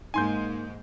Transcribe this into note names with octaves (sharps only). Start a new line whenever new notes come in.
G#2 G#3 A#3 D#4 G#5 C6 G6